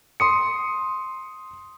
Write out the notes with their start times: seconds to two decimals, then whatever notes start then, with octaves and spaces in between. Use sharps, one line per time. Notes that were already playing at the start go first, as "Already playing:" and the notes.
0.20 C6 D#6 C#7